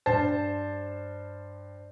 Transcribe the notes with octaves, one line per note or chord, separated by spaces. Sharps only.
G2 C5 A5